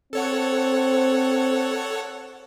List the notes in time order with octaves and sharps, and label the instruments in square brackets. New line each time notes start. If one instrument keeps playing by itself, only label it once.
[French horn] C4 [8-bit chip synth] A4 C#5 F#5